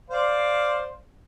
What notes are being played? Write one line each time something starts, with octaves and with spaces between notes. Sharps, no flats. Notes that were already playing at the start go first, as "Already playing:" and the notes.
C5 D5 F5